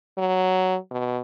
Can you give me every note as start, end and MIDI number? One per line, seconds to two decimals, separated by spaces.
0.18 0.77 54
0.91 1.21 47